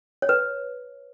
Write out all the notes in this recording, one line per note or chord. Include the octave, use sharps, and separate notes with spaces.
C#5
B4